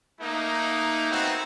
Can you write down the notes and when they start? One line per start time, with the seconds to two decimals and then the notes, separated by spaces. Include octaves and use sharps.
0.21 A3 A#3 D#4
1.10 A3 B3 C4 D#4 F#4